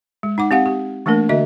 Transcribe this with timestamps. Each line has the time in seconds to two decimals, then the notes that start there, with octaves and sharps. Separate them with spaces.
0.23 G#3
0.38 D#4 F#5 D6
0.51 C4 G4 F5 F#5
0.66 G4
1.06 E3 A3 A#3 D4 A#4
1.29 D3 F#4 D#5 E5